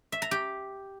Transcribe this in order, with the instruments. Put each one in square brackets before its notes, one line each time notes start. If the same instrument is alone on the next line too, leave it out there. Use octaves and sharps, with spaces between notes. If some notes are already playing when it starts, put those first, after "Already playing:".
[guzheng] E5
A#5
G4